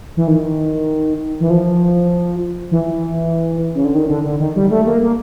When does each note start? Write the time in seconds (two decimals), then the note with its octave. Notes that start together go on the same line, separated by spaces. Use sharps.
0.17 E3
0.28 D#3
1.40 E3
1.50 F3
2.71 E3
3.74 C#3
3.85 D3
3.95 D#3
4.09 D3
4.25 D3
4.40 D#3
4.56 G3
4.70 A3
4.86 A#3
5.02 A#3